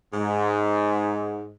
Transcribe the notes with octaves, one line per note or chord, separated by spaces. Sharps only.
G#2